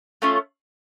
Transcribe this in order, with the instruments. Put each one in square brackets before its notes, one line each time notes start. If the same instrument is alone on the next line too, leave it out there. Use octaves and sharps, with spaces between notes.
[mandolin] A3 C#4 F4